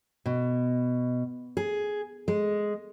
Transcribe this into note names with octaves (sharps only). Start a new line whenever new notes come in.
B2
G#4
G#3